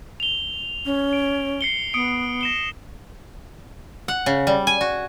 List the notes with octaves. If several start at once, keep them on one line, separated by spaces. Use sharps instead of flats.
F7 G7
C#4
D7
C7 C#7 G7
B3 D#6 C#7 D7
A#6 E7 G7
F#5
C#3
G3
G#5
F#4